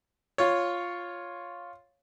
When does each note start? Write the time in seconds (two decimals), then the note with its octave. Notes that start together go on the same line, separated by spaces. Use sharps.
0.38 F4 C#5